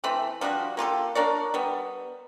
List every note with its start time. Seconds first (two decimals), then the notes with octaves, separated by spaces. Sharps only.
0.04 E3 A3 C4 B5
0.41 F3 G3 D4 F#4
0.77 A#3 F4 G4 A4
1.15 D4 A#4 C#5 D5
1.54 G3 B3